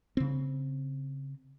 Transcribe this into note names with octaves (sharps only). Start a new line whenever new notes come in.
C#3 C4